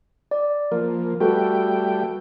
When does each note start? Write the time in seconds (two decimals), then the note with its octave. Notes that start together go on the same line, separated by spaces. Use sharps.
0.31 D5
0.72 F3 A#3 A#4
1.21 G3 A3 F#4 A4 B4 G5